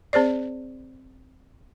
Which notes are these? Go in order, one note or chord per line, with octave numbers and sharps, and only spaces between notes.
C4 G#4 C5 D5